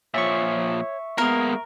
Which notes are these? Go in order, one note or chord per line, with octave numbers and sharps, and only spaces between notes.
A#2 F3 C#5 E5 C#6
G#3 A#3 B3 A#4